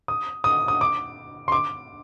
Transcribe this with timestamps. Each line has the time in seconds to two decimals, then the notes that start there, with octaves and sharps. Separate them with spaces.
0.08 D#6
0.44 D#6
0.68 D#6
0.81 D6
1.48 C6
1.52 D6